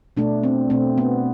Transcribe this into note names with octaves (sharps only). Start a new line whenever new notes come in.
B2 A3 D4
C4
B2 A3 C4
B3